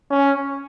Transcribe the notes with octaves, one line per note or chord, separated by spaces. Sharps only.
C#4